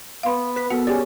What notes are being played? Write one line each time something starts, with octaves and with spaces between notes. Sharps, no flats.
B3 F5 C6
B4 B6
B3 F#4 A4 A#4 F#5
C#4 G4 G#4 D5